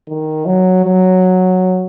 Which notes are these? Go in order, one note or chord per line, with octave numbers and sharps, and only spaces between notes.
D#3
F#3
F#3